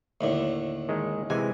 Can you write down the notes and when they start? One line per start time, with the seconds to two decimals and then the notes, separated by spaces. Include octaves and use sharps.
0.21 D#2 A2 D3
0.89 D#3 G#3
1.30 C3 E3 G#3 G#5